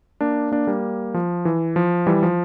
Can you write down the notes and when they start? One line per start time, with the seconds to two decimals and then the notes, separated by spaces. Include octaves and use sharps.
0.21 A#3 D4
0.51 A#3 D4
0.67 G3 A#3
1.14 F3
1.45 E3
1.76 F3
2.07 E3 G3
2.23 F3